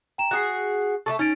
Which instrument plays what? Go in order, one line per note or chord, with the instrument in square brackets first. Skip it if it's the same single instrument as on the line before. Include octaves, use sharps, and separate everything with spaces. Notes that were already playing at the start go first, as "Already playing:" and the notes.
[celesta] G5 A#5 E7
[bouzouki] F#4 G#4 [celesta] F#6 C7
[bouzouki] A3 G#4 A4 [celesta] C#6
[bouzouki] C#4 [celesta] D#4 A6 D7